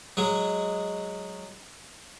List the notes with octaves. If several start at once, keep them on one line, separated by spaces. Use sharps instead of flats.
F#3 G#3